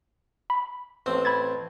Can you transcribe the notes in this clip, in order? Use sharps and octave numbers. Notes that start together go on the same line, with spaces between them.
B5
A1 C4
B5 G#6 A6